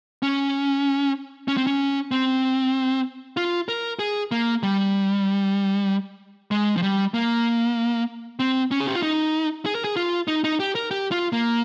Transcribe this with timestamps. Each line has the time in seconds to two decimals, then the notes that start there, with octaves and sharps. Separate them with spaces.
0.23 C#4
1.48 C#4
1.57 C4
1.67 C#4
2.11 C4
3.37 F4
3.68 A#4
3.99 G#4
4.31 A#3
4.63 G3
6.51 G#3
6.76 F3
6.82 G3
7.14 A#3
8.39 C4
8.71 C#4
8.80 G#4
8.88 G4
8.95 F4
9.02 D#4
9.66 G#4
9.75 A#4
9.84 G#4
9.96 F4
10.28 D#4
10.44 D#4
10.60 G4
10.75 A#4
10.91 G4
11.11 F4
11.32 A#3